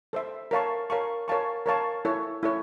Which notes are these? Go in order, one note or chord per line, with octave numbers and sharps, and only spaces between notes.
A4 C5 E5
A#4 C#5 F5 A5 C#6
A#4 C#5 F5 A5 C#6
A#4 C#5 F5 A5 C#6
A#4 C#5 F5 A5 C#6
E4 A4 C#5
E4 A4 C#5